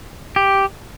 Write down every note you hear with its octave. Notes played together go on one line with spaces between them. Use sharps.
G4